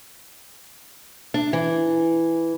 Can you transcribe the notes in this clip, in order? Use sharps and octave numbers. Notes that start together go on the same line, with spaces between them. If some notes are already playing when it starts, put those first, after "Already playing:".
D4
E3